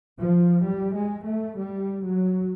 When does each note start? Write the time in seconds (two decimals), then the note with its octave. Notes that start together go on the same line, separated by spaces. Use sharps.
0.18 F3
0.65 G3
0.95 G#3
1.25 A3
1.57 G3
2.04 F#3